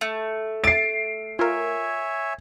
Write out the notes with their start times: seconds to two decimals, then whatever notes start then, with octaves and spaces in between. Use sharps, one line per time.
0.01 A3
0.64 E5 A6 C7 D7
1.39 F4 A#4 C#5 E5 G#5